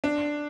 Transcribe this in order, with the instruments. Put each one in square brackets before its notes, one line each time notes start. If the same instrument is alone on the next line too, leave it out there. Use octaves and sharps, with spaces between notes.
[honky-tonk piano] D4